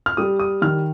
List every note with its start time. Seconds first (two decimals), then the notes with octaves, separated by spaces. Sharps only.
0.06 F6
0.17 G3 D#6
0.39 D#6
0.62 D#3 F6